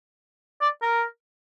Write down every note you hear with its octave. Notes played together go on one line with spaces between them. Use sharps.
D5
A#4